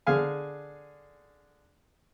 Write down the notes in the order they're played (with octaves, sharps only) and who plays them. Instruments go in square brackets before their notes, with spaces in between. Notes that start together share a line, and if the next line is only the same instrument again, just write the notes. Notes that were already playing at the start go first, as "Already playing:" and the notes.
[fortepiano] D3 G#4 F5 G#5